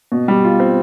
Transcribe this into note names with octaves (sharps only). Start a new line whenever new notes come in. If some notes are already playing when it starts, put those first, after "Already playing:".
B2
G3
F4
C4